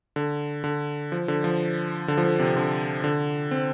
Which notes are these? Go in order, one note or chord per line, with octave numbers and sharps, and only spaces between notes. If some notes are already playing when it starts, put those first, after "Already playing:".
D3
D3
F3
D3
F3
D3
F3
D3
C3
D3
D3
C4